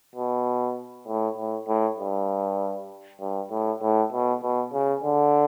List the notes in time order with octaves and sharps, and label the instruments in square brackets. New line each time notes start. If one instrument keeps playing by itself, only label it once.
[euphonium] B2
A2
A2
A2
G2
G2
A2
A2
B2
B2
C#3
D3